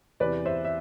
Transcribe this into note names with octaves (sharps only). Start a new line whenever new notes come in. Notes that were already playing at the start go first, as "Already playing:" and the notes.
E2 C3 E3 B4 D5
C5 E5
E5